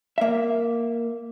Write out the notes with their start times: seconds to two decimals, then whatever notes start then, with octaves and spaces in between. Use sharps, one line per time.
0.18 A#3 E5